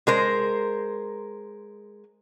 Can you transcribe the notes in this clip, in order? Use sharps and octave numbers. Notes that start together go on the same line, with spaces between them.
G#3 A#4 C5